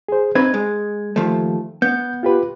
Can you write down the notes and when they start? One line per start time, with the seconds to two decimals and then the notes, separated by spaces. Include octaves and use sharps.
0.09 G#4 C5
0.35 C4 D#4 B4 G#6
0.54 G#3
1.16 D#2 F3 A3
1.82 B3 G6
2.23 F4 G4 B4